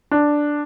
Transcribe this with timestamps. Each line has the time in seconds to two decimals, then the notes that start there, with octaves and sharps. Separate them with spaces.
0.11 D4